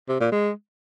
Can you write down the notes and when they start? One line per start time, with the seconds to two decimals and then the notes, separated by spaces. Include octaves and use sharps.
0.09 C3
0.20 A#2
0.32 G#3